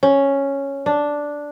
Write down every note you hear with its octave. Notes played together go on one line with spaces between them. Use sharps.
C#4
D4